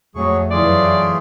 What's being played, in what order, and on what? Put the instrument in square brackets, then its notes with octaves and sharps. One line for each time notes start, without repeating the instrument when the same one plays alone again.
[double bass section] F2 A3 [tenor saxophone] F#3 [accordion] G#4 C#6
[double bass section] F#2 E3 F#3 [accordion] A3 F4 G#4 [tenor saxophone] D5